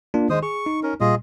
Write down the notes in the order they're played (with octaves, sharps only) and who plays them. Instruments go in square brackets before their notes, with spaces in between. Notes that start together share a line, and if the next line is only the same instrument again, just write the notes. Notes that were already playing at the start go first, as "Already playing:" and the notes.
[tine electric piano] A#3 D4 F4
[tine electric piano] D#3 [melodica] G#3 C5 D#6
[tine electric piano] G#4 [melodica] C#6
[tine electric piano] D#4
[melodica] C#4 A#4
[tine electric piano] A#2 G3 [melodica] F4 G#4 D#5